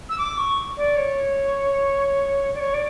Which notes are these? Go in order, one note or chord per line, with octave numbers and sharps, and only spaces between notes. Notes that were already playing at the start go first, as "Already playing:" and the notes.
E6
D6
C#6
D5
C#5
D5
C#5
D5